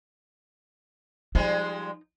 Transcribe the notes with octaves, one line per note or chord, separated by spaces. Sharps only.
F3 G3 G#3 D#4